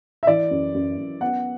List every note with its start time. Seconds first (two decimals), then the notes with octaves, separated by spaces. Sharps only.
0.23 E5
0.27 E3 D5
0.51 F#2
0.74 F#2
0.98 F#2
1.21 B3 F#5